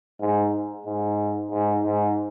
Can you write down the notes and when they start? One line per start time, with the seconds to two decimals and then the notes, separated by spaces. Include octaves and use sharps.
0.21 G#2
0.86 G#2
1.51 G#2
1.85 G#2